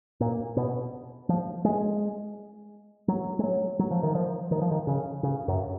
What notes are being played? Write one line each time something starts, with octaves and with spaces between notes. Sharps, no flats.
A#2
B2
F3
G#3
F#3
G#3
F#3
F#3
F3
D#3
F3
D#3
F3
D#3
C#3
C#3
F#2